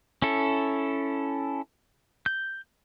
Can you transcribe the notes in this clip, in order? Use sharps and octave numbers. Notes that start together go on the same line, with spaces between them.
C#4 E4 A4
G6